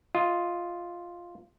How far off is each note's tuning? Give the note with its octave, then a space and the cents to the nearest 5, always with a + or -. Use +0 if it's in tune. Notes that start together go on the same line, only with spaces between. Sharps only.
F4 +0 D#5 +15